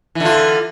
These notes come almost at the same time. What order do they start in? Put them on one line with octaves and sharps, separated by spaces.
E3 D3 F4